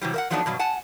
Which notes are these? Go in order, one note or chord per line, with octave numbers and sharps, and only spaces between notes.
C3 E3 F#3 G3
A#4 E5 F#5
F3 F#3 A3 B3 D4 D#4
G2 B2 F#3
F#5 G#5 A5